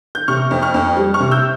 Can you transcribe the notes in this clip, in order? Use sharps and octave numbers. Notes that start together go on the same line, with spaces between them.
G6
C3 C#6 F6
F2
C#6 F6
F2
G3
C#6 F6
C3
E6 G6